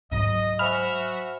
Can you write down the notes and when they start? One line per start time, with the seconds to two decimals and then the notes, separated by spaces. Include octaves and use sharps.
0.12 G#2 F#3 D#5
0.59 F#4 C5 E5 G#5 B5 F6